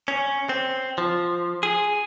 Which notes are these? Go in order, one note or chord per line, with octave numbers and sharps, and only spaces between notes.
C#4
C4
F3
G#4